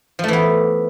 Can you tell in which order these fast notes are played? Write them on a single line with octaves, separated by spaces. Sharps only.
F3 A3 E3 B3